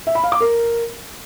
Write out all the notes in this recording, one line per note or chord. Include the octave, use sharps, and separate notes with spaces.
E5
B5
F5
D6
A#4